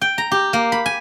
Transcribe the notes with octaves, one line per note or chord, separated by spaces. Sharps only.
G5
A#5
G4
A#3
B5
G#5